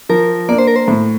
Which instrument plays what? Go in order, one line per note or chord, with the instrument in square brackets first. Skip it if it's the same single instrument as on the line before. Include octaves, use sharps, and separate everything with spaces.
[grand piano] F3 [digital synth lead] A#4
[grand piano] A#3 D4 [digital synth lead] D5
[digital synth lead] C5
A#4
C5
[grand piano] A2